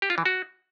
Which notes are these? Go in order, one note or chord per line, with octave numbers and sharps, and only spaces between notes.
G4
F4
E3
F#4